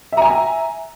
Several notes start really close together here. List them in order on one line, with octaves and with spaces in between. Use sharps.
E5 A#5 G#5